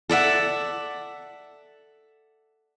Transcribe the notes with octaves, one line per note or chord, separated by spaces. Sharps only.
A4 D5 E5 F#5